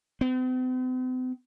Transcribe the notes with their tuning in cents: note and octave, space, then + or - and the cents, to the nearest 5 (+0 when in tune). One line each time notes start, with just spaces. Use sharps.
C4 -45